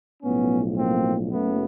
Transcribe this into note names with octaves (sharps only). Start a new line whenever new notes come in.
B1 A2 F3 B3 C#4
A#3 C4
F#1 F#2 C#3 A3 B3